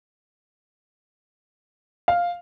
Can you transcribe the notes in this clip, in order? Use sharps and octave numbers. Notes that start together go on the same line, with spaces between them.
F5